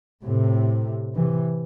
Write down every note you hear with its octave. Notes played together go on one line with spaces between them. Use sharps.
A2 C3
C3 E3